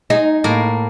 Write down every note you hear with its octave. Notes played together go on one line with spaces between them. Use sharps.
D#4 G#4
A2 A#3